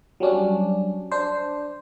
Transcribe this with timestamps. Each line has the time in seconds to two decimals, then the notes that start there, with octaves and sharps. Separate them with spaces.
0.20 F#3 G3 C#4 D4
1.11 D4 C5